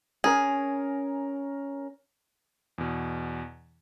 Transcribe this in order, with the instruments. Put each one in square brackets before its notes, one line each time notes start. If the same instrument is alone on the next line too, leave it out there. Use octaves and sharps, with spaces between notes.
[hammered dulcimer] C#4 A#4 [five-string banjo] G#4
[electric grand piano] E2 B2